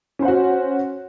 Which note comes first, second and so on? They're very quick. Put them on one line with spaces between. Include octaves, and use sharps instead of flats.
C#4 C5 F#5 F#4